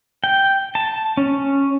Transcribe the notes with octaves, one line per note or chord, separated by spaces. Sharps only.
G5
A5
C#4